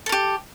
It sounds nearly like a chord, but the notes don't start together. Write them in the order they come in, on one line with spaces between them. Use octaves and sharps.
A4 A#4 G4